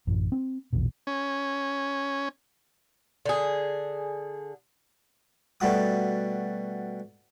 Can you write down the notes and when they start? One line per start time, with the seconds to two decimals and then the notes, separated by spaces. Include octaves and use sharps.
0.07 A1 F#2
0.32 C4
0.73 A#1 E2 B2
1.07 C#4
3.26 D3 G#4
5.60 B2 G3 A3 F#4 D#6